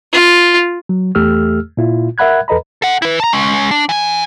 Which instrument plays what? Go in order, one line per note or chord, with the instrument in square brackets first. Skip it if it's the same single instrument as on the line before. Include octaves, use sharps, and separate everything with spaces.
[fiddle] F4
[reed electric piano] F#3
E2 A3 G4 A4 E6 F6
A#2 E4 F4
A#4 E5 F#5 B5 F#6 G#6
E2 A4 B4 D#5 A#5 B5
[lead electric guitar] A4 F#5
E4 B4
A5 A#5
G#3 C#4
D4
E3 G#5